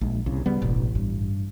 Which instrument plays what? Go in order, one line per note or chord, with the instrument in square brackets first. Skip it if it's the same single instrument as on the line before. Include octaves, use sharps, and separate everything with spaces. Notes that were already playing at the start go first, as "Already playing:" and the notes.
[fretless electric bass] A#1 G#3
C2 C#3
C#3 G3 B3
[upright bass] E1 [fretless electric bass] A1 A2
[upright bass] G2